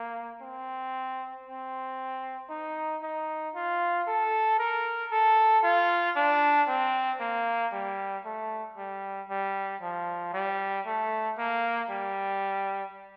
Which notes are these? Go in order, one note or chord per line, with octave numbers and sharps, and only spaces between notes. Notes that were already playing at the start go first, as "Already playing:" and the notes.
Already playing: A#3
C4
C4
D#4
D#4
F4
A4
A#4
A4
F4
D4
C4
A#3
G3
A3
G3
G3
F3
G3
A3
A#3
G3